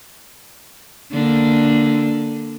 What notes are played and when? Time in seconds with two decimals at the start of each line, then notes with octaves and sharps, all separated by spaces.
1.13 D3 A#3 D4